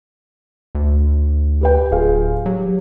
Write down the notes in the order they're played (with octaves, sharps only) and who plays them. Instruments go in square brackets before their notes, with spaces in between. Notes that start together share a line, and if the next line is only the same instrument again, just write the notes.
[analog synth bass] D2
[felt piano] G4 B4 G5
[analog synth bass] D1 [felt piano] F4 G#4 F5
[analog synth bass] F#3 [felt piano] G4